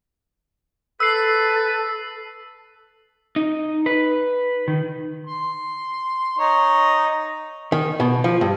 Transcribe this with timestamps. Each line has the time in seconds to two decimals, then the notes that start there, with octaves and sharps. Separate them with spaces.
1.00 A4 B4 E6 C7
3.36 D#4
3.86 B4
4.68 D#3
5.27 C6
6.39 D#4 C#5
7.72 D#3
8.00 B2
8.24 F3
8.41 G2